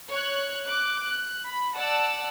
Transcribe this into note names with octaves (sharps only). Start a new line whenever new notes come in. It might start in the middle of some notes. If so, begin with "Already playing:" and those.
C#5 F#6
D6 F#6
F#6
B5
D5 F#5 A5 E6